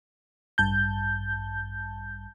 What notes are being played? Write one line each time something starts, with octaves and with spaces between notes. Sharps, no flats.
A1 G2 A5 G6